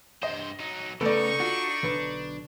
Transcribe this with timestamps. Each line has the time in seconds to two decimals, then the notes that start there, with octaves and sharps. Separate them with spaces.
0.23 G2 C5 D#5
0.60 F#3 D#4
1.01 C#3 A3 B3 D#4 A4 B4 D5 C#6
1.40 D4 F4 F#4
1.83 B1 D3 B4